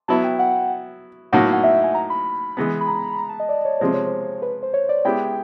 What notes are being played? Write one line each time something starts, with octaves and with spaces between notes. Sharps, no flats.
F#3 B3 E4 A5
G5
F#5
A2 F#3 A#3 D#4 F#4 F#5
F#5
E5
E5
G#5
A#5
B5
E3 G#3 B3
B5
A#5
A#5
A5
D#5
D5
C#5
C3 F3 G#3 C5
C#5
C5
B4
C5
C#5
D5
G#3 B3 E4 G4 G5